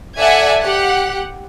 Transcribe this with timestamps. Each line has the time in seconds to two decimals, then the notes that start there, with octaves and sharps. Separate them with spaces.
0.19 A4 D5 E5 F#5 G#5 G#6
0.60 G4 F#5